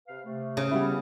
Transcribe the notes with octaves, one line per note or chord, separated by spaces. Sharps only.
C3 B4 F5
C3 A3
C#3
G3 B3 C#4 E4